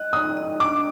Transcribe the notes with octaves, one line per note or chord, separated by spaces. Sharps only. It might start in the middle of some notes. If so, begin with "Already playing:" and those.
Already playing: D#5 F#6
D#4 D#6
D#5
D4 D6